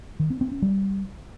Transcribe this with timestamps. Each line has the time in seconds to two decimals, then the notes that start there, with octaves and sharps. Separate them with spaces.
0.20 D#3
0.30 C4
0.41 C4
0.52 C#4
0.62 G3